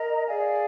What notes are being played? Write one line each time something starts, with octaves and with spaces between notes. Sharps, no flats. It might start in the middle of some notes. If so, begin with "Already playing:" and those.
Already playing: A#4 D#5 A#5
G#4 D5 F5 G#5